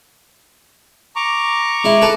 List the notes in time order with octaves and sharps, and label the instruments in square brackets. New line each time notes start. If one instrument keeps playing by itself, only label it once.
[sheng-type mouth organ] A#5 C#6 D6
[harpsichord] G#3 E4
A4 B4 A5